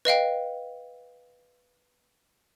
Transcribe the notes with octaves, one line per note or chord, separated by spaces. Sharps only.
B4 D#5 F5 G5